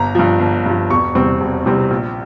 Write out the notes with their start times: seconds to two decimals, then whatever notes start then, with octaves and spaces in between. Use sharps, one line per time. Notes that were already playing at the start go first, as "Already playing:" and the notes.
Already playing: G1 A#5
0.15 G2 F3
0.39 G1
0.66 G2 F3
0.90 E1 C#6
1.15 E2 C3 G3 C4
1.41 E1
1.66 E2 C3 G3 C4
1.90 A#1